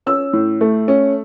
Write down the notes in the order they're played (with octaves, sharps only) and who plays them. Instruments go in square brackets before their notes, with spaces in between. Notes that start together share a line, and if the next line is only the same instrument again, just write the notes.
[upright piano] C#4 E6
A2
A3
C#4